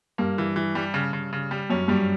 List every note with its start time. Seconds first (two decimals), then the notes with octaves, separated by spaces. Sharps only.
0.18 G2 A#3
0.38 E3
0.56 E3
0.75 G3
0.94 C#3
1.13 C#3
1.33 C#3
1.51 G3
1.70 F#2 C#4
1.88 G2 G3